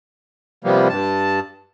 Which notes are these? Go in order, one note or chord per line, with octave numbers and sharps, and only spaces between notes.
C3 F3 G3 A#3 B3
G2 A5